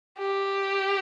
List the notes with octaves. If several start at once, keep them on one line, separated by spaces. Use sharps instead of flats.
G4